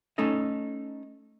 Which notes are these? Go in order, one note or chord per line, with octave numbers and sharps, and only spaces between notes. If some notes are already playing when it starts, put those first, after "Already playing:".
A3 C#4 D#4 A4 D#5